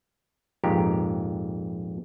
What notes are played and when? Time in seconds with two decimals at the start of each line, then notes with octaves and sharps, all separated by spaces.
0.64 A#1 F2 G#2 G4 A#5